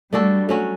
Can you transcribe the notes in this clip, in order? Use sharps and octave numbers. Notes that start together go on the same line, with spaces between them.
G3 A3 D4 F#4 A4
F#3 A3 C#4 F#4